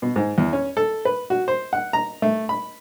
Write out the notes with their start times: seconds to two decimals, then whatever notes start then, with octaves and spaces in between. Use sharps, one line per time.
0.02 B2
0.16 G#2
0.38 E2
0.53 C#4
0.77 A4
1.05 B4
1.30 F#4
1.48 C5
1.73 F#5
1.93 A#5
2.22 A3
2.49 B5